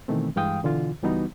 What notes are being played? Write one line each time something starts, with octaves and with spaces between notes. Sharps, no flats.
B2 D#3 E3 A3 C4
G2 E3 G#3 F5 G5 D#6
B2 D3 E3 F4
C#2 E3 G3 B3 D#4 F#4